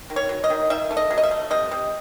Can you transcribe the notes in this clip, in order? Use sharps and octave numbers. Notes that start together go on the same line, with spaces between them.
D#3
C#5
F#3
D#5
D#3
D#3 E5
A3
D#5
F#3
D#5
E5
A3
C3 D#5
C3